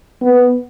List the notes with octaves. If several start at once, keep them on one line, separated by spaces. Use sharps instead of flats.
B3